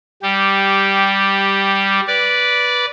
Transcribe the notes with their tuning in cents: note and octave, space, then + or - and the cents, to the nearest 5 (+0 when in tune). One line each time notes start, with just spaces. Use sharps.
G3 +0 G4 -5
B4 -10 D5 -10